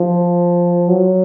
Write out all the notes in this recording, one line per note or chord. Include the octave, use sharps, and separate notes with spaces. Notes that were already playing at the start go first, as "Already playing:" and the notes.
Already playing: F3
F#3